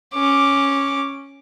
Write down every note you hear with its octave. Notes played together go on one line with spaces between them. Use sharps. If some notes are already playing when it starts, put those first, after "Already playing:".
C#4 D6